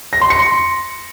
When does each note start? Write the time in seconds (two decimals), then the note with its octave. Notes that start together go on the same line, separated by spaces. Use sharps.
0.13 A#6
0.21 C6
0.30 C#7
0.39 C6